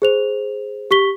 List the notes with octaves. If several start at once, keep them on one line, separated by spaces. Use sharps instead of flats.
G#4 C5 F7
G4 C#6 B6 G7